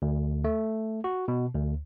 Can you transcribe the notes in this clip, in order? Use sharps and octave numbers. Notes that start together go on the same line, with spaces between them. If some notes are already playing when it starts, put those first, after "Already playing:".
D2
A3
F#4
B2
D2